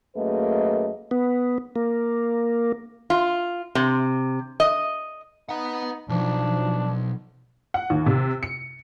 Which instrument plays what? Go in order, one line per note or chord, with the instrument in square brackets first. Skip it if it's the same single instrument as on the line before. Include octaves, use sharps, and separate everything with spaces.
[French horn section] F#2 A3 A#3 G#4 B4 D#5
[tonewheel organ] B3
A#3
[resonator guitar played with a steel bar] F4
C3
D#5
[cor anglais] D#4 [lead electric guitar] B4 F#5
[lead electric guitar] B1 [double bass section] F3 [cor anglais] D4
[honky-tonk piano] F#5
D#2
C3
C#7